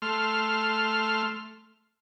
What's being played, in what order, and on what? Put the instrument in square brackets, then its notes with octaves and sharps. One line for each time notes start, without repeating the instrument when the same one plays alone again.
[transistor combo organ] A3 C6 F6